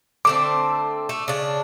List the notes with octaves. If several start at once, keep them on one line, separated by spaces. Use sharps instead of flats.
D3 A3 C4 D6
A3
C#3 D4